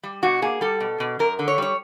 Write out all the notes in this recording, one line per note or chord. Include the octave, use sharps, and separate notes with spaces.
G3
B2 F#4
A#3 G#4
G3 A4
B2
B2
F#2 A#4
D3
C#5
G3 C#5